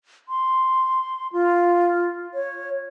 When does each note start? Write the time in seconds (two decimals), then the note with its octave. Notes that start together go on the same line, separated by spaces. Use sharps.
0.29 C6
1.33 F4
2.34 C#5